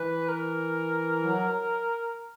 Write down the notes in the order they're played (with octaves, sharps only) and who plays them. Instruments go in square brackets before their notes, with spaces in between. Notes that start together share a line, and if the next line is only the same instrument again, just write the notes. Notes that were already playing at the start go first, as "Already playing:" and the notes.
Already playing: [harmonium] E3 [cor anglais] B4
[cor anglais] A#4
[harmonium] F#3